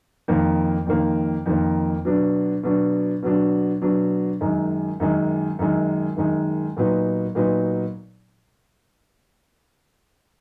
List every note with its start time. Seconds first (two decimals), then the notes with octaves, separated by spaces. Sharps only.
0.28 F2 D#3 A#3
0.86 F2 D#3 A#3
1.46 F2 D#3 A#3
2.05 B2 F#3 D4
2.63 B2 F#3 D4
3.23 B2 F#3 D4
3.82 B2 F#3 D4
4.41 F#2 D#3 G#3
5.00 F#2 D#3 G#3
5.59 F#2 D#3 G#3
6.17 F#2 D#3 G#3
6.77 A#2 F#3 B3 D#4
7.35 A#2 F#3 B3 D#4